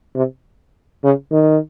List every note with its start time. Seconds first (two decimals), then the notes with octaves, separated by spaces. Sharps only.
0.15 C3
1.03 C#3
1.32 D#3